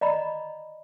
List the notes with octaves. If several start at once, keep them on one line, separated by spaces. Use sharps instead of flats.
D5 D#5 A#5 B5